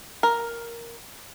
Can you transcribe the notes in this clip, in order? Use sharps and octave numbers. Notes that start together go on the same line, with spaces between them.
A#4